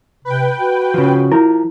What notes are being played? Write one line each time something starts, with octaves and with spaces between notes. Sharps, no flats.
C3 B4 G5
F#4
C#3 F3
F3 E4 A#4